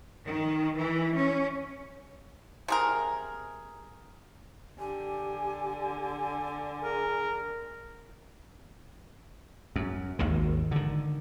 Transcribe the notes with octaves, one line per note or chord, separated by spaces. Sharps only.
D#3
E3
C#4
C3 G#4 A#4
D3 G4 G#5
G#4 A#4
F#2
G#1 D#2 D#3
D3 D#3